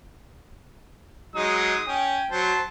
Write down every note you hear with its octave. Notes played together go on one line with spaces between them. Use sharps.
F#3 G#3 D#4 D#6
C#4 G5
F#3 C5 A5